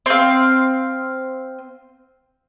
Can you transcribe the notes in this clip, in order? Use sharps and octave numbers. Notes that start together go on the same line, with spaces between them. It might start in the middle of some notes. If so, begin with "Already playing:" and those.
C4 F5